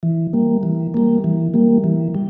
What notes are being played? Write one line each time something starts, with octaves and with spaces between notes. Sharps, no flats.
E3
G3 A#3
E3
G3 A#3
E3
G3 A#3
E3
G3